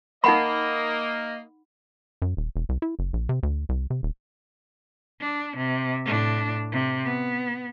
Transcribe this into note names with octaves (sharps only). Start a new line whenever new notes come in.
A#3 D#4 D#5 F#5 B5
F#2
D#1
E1
C2
E4
F#1
A#1
C3
D2
C2
C3
D#1
D4
C3
A2 D4
C3
B3